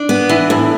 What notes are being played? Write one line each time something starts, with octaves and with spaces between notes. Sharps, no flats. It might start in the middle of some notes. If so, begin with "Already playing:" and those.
Already playing: D4
B3
E3
A2